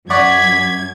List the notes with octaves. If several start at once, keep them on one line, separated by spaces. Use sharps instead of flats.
F#2 D5 F#5 C#6 G#6 B6